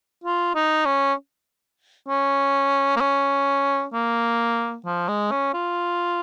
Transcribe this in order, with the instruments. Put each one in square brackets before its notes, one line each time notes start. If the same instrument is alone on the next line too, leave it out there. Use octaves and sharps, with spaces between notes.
[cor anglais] F4
D#4
C#4
C#4
A#3
C#4
A#3
F3
G#3
C#4
F4